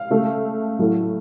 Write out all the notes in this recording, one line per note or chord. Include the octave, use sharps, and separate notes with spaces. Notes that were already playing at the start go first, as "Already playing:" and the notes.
Already playing: F5
C#3 A3
A2 F#3 A3